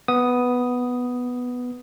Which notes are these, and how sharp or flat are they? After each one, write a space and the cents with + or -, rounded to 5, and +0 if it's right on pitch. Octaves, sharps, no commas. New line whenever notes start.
B3 +0 D#6 +0